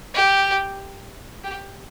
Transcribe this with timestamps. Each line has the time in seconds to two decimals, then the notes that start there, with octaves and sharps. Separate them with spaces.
0.14 G4
1.44 G4